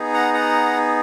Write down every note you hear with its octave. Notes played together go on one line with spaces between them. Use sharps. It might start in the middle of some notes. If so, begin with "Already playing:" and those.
Already playing: B3 D#4 G#4
F#5 A#5
F#5 A#5